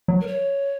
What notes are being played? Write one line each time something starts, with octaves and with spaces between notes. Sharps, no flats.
F#3
A#4
C#5